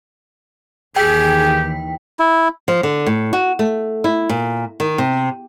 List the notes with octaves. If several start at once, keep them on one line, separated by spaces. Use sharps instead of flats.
D#2 D#3 E3 G4 G#4 G5 B6
E4
F3
D3
A2
F#4
A3
E4
A#2
D#3
C3